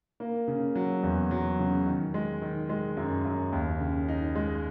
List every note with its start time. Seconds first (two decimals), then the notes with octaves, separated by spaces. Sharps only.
0.20 A#3
0.48 C#3
0.75 F#3
1.03 E2
1.31 F#3
1.59 C#3
1.86 D#3
2.14 G#3
2.42 D#3
2.69 G#3
2.97 F#2
3.25 F#2
3.52 D#2
3.80 C#3
4.08 D#4
4.35 G#3